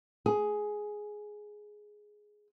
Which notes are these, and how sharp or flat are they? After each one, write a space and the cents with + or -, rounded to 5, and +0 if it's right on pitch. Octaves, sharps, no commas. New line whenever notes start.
G#4 +10